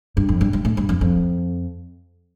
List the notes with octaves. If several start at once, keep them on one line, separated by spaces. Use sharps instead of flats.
G2
F2
G2
G2
A2
G2
F2
F2